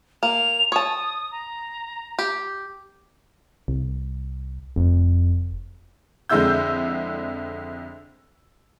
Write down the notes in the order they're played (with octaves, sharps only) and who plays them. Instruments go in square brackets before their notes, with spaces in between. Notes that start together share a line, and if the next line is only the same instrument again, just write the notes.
[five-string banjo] A#3 [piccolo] F7
[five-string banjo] C#5 A5 [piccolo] D#6
[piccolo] A#5
[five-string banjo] G4
[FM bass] C2
[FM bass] F1 [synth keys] F2
[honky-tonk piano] F2 D3 G#3 E4 E6 G6